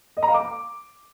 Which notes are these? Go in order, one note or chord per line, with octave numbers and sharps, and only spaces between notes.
D#5
A#5
F5
D6